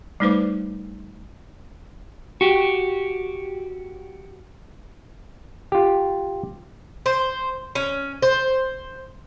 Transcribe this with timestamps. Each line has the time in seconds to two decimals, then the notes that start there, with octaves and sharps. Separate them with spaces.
0.20 G3 A3 D#4 B4 C5 D6
2.41 F#4 G4
5.72 F4 G4
7.06 C5
7.75 C#4
8.22 C5